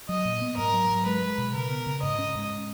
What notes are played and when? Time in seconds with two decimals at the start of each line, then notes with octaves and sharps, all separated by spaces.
0.09 F#3 D#5
0.25 A#2
0.42 B3
0.57 G#2 A#4
0.73 F#3
0.90 F#3
1.06 G#3 B4
1.22 G#3
1.38 B2
1.54 C#3 A#4
1.70 B3
1.86 C#3
2.03 G#2 D#5
2.19 C#4
2.35 G#2